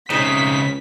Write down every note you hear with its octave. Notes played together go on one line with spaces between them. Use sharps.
C#2 C#3 C4 D#4 B6